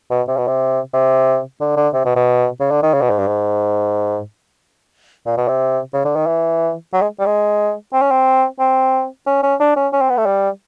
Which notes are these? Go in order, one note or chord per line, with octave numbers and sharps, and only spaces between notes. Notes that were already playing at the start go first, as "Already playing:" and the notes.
B2
C3
B2
C3
C3
D3
D3
C3
B2
B2
C#3
D3
D#3
C#3
B2
G#2
G2
G#2
A#2
B2
C3
C#3
D3
D#3
E3
F#3
G#3
G3
G#3
C4
C#4
C4
C4
C#4
C#4
D4
C#4
C#4
C4
B3
A3
G3